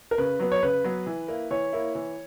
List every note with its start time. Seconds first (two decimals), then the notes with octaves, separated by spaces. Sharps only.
0.11 A#4
0.18 C#3 B4
0.40 F#3 B3
0.52 C#5
0.63 C#3 B4
0.84 F#3 B3
1.07 E3
1.28 A#3 E4
1.51 E3 C#5
1.73 A#3 E4
1.95 E3